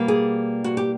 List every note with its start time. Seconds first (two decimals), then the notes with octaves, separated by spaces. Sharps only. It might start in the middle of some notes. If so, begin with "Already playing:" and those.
Already playing: B2 G3 A#3
0.08 G#4
0.64 F#4
0.77 G4